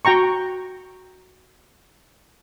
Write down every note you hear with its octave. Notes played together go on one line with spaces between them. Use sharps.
F#4 G5 A#5 C#6